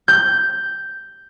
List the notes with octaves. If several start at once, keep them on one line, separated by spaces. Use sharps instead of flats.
G6